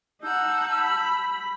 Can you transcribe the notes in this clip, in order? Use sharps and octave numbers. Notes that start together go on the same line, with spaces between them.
D#4 F#5 A5 E6 G6
B5